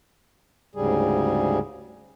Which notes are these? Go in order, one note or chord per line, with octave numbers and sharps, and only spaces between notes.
D2 G#2 C#3 G3 G#4